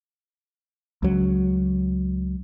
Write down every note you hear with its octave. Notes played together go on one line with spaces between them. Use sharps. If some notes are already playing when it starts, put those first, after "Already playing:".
C#2 F#3